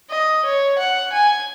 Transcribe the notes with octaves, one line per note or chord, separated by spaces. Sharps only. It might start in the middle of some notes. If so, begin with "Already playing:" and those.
D#5
C#5
F#5
G#5